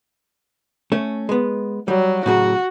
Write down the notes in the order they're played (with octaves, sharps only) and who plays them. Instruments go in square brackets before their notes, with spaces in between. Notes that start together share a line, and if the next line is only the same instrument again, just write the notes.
[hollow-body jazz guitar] A3 C#4
G#3 B3
[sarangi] F#3 [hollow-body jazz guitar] G3
[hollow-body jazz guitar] A2 C#3 F#3 [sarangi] F#4